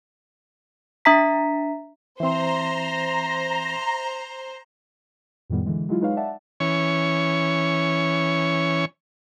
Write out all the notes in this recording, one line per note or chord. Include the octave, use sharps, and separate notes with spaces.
D4 E5 A#5 B6
E3 C4 C5 E5 A#5 C6
F2 A2 D#3 G3 B3
D3 E3 G#3
F#3 G#3 E4 F4
G#3 D#4 B4 C#5 F5
D5 E5 F#5 A5
E3 C#4 C#5